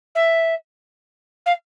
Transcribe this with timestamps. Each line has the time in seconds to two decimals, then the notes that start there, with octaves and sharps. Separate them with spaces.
0.15 E5
1.46 F5